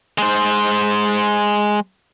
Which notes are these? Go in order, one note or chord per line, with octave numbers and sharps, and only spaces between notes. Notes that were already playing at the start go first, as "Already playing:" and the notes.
G#3 C5